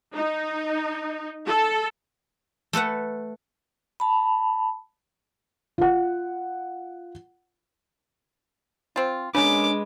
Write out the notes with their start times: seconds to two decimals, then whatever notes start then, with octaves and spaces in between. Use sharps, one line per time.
0.14 D#4
1.46 A4
2.73 A3 A4 B4 F#5
4.00 A5 B5
5.78 F4 F#5
8.96 C4 F4
9.35 C#3 G#3 C#4 D4 A#4 B4 D6